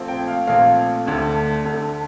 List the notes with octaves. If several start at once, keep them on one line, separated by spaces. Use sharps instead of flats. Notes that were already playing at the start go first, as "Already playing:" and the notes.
Already playing: A#1 A#2 A3 C4
G5
F5
A#1 A#2 A3 C4 F5
D2 D3 A3
D2 D3 A3